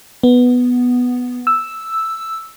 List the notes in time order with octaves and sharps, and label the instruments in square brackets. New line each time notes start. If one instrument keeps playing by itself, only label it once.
[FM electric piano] B3
E6